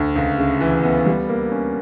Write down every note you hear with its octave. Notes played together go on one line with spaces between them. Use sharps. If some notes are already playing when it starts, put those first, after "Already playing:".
Already playing: D2
C#2
C#3
E3
B3
G3
A#3
C#4